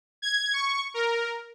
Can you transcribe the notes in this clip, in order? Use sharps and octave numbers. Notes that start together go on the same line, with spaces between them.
G#6
C#6
A#4